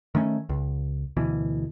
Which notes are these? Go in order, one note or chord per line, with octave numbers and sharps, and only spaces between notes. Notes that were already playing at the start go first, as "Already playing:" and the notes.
D#3 A3 B3 C#4
C#2
D2 B2 E3